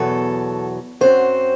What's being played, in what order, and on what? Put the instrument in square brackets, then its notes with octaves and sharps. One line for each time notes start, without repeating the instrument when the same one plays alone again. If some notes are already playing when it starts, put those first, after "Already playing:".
Already playing: [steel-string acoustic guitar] E2 B2 F#3 A4
F#2 F#3 C4 C5